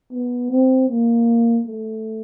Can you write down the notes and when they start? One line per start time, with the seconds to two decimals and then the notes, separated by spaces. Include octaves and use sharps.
0.12 B3
0.51 C4
0.90 A#3
1.67 A3